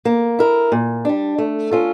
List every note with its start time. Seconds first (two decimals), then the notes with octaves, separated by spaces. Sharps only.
0.05 A#3
0.39 E4 A#4
0.72 A#2
1.05 G3 D4
1.38 A3
1.71 C#4 F4 A4